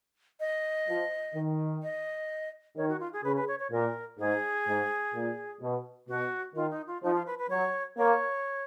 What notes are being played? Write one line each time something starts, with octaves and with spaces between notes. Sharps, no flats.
D#5
F3
D#3
D#5
D#3 C#5
F#4
F4
G#4
C#3 B4
B4
C#5
C#5
A#2 A#4
G#2 G#4
G#2
A#2
B2
B2 F#4
D#3 F4
D#4
F4
F3 D#4
F4
B4
B4
F#3 C#5
A#3 C#5